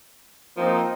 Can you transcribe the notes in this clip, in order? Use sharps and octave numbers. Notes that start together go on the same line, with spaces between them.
F3 A#3 C4 D#4